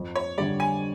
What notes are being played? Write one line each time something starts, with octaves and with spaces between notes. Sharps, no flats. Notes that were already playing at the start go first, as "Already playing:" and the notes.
Already playing: F2
C#5
D3 G3 D5
G#5